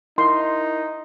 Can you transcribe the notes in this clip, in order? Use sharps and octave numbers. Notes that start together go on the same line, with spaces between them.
D#4 E4 A#4 D#5 C6